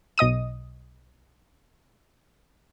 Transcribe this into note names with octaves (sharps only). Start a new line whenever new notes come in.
B1 D#5 D#6 D#7